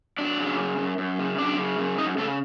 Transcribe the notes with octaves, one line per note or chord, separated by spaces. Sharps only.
F#3 D4 D5
C#3
F#2
F#2
F#2
C#3
F#2 D4 D5
C#3
F#2
F#2 D#4 D#5
C#3 A3 A4